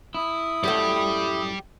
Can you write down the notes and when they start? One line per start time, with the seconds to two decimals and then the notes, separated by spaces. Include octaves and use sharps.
0.15 E4 D#6
0.64 F#2 A2 A3 G4 D5